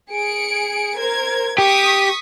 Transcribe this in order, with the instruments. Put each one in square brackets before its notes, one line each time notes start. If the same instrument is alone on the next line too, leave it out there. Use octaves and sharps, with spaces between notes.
[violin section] G#4 C#7 D7
A#4 C5 G#6
[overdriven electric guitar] G4 [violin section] C#6 D#6 B6